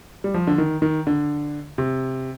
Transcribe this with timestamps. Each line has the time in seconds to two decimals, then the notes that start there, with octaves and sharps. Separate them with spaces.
0.24 G3
0.34 F3
0.47 D3
0.58 D#3
0.82 D#3
1.07 D3
1.78 C3